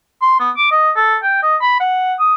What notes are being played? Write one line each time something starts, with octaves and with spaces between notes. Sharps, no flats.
C6
B3
D6
D#5
A4
G5
D#5
B5
F#5
D#6